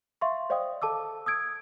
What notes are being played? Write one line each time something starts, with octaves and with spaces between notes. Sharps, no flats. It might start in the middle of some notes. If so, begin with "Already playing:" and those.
E5 F5 C6 C#6
C5 D5 D#5 F5 G5 D#6
A4 A5 D6 E6
D#6 E6 G#6 D7